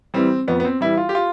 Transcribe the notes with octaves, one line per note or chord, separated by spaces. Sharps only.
E3 G3 C4
F2 B3
B3
C4
E3 G3 E4
F4
G4
F4